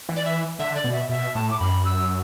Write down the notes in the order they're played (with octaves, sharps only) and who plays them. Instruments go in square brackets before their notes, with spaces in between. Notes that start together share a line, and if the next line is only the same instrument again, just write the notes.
[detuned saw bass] E3
[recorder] D5
E5
[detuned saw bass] D3 [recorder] E5
[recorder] D5
[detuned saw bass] B2
[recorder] E5
[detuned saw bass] B2 [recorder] E5
[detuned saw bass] A2 [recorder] A5
[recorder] D6
[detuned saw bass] F#2 [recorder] B5
[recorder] E6